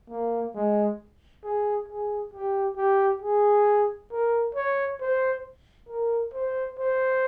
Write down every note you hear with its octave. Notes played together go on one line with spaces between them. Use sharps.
A#3
G#3
G#4
G#4
G4
G4
G#4
A#4
C#5
C5
A#4
C5
C5